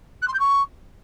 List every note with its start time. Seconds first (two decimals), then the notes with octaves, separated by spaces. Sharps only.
0.22 F#6
0.27 C6
0.33 G6
0.39 C#6